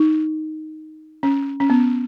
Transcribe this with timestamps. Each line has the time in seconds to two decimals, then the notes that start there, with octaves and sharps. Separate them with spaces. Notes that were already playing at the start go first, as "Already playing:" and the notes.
Already playing: D#4
1.23 C#4
1.60 C#4
1.70 B3